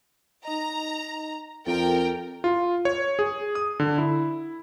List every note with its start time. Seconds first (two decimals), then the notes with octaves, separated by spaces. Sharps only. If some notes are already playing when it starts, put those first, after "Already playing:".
0.45 D#4 D#5 A#5
1.66 F2 A4 A#4 G5
2.44 F4
2.85 C#5
3.19 G#4
3.55 D#6
3.80 D3
3.98 E4